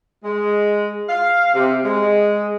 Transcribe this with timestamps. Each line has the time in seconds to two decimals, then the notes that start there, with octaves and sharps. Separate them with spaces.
0.24 G#3
1.09 F5
1.54 C3
1.85 G#3